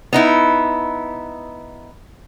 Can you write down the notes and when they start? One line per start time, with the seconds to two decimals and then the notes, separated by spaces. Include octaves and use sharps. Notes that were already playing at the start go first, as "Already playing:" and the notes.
0.13 B3 D#4 E4